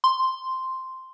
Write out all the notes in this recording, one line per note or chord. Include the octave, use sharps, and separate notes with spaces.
C6